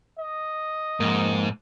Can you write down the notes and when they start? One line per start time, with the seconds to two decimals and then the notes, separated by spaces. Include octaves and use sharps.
0.19 D#5
1.00 F2 G#2 A#3